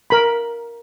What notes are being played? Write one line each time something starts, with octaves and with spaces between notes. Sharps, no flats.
A#4 B5